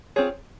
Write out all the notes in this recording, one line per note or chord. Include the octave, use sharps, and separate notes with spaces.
C4 F4 G#4 C#5